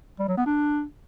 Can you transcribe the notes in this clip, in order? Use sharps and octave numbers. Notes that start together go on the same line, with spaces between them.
G3
F#3
B3
D4